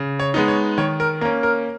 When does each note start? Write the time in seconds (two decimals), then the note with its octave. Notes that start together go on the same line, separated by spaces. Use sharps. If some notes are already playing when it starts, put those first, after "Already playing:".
Already playing: C#3
0.19 C#5
0.34 G#3 B3 D#4
0.48 C#5
0.78 D#3 C#5
1.00 A#4
1.21 A#3 C#4 A#4
1.43 A#4